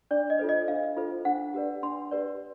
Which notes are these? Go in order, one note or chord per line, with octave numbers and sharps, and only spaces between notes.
D4 D5
D#5
F4 A4 C5
D#5
D4 F5
F4 A4 C5
D4 F#5
G4 B4 D5
D4 C6
G4 B4 D5